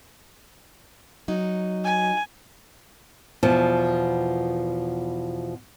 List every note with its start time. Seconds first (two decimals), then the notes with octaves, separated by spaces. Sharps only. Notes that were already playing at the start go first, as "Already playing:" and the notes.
1.28 F#3 D#4
1.84 G#5
3.43 E2 B2 F3